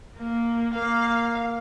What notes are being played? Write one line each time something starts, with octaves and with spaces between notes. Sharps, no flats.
A#3
A#3 F5